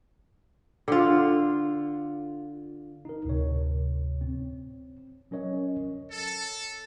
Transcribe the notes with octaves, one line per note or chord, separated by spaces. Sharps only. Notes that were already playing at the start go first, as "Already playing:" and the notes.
D3 F4
D#4 A#4
D2 A2 C3 C#5
C4
F#3 C#4 A#4 C#5 D#5
A4